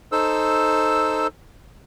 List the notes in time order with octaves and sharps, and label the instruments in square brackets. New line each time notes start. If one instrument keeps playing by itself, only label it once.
[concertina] D#4 A4 C5 E6